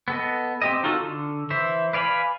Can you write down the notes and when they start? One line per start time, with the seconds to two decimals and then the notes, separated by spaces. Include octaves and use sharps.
0.08 B3 A4 D#5
0.62 C4 G4 D#5
0.84 D#4 F4 F#4 A4
1.00 D3
1.50 E3 C5 E5
1.93 B4 D5 F5 G#5 B5